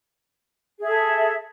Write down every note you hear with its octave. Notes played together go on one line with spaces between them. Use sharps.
G#4 A4 E5